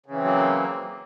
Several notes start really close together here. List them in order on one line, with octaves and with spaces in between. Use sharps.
C#3 E3 C4 F#3 A#3